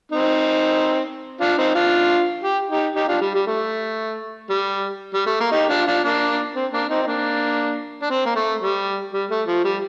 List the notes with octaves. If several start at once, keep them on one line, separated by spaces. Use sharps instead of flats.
C4 D#4
D4 F4
C4 D#4
D4 F4
G4
D#4 G4
D#4 G4
D4 F4
G3
G3
A3
G3
G3
A3
A#3
D#4 G4
D4 F4
D4 F4
A#3 D4
C4
A#3 D4
C4 D#4
D#4
A#3 D4
D4
C4
A#3
A3
G3
G3
A3
F3
G3